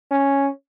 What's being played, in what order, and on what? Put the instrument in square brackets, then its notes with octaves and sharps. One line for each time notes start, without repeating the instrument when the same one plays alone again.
[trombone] C#4